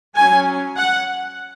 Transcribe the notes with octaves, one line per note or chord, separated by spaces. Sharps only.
F#3 C#4 G#5
F#5